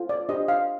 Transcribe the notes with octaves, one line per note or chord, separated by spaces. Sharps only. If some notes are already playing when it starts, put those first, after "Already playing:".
Already playing: F4 A4 C5
D5
D4 G4 C5 D#5
F5